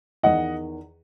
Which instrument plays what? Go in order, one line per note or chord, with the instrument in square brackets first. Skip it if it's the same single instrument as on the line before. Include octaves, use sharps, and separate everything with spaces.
[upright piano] E2 D#3 D#5 F#5